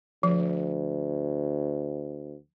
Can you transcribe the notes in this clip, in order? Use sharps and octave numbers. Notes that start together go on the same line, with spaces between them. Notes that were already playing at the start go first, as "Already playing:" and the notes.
D2 F3